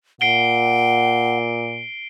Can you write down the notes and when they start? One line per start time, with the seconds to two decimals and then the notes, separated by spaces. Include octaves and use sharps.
0.21 A#2 F#5 C7 D7 G7